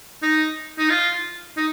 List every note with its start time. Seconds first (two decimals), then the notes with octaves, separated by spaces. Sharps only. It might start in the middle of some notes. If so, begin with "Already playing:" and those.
0.23 D#4
0.78 D#4
0.90 F4
1.57 D#4